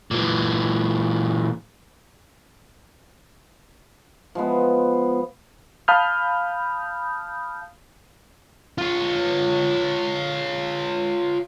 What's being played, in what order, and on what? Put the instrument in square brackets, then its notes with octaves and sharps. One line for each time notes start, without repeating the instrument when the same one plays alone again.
[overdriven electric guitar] A#2 E3
[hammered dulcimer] F3 G#3 B3
[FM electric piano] F5 A5 B5 D#6 F6 G6
[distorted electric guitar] F4 C#5